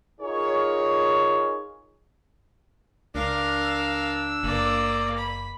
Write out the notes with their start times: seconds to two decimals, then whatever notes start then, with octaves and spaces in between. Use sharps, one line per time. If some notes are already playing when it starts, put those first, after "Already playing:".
0.21 D#4 F4 G#4 A#4 C#5
3.15 C#2 D4 A#4 F5
3.61 E6
4.43 F#1 A#3 D5
5.18 B5